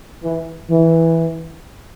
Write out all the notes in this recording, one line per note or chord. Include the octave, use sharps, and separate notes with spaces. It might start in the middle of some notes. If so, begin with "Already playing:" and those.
E3
E3